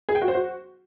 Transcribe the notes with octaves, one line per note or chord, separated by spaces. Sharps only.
G#4
G5
F#4
C5
F#4